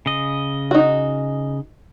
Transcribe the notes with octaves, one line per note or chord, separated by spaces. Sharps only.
C#3 D#5
D#4 F#4